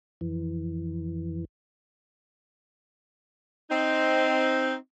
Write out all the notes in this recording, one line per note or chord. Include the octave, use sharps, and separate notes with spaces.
F2 E3
C4 D#4